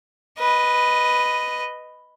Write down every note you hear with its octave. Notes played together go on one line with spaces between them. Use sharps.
B4 D#5